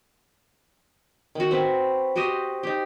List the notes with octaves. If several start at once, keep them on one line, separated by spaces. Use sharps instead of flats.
D#3 F#4
C4 B4 E5
F#4 G4 C5 D#5
D#4 G4